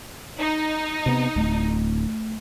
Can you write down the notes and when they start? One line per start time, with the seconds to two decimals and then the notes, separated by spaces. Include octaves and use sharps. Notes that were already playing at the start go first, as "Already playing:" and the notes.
0.40 D#4
1.06 C3 B3
1.36 D1 A3